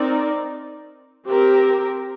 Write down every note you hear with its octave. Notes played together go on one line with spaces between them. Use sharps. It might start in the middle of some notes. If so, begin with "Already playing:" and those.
Already playing: C4 D#4 A#4 D5
C4 G4 A#4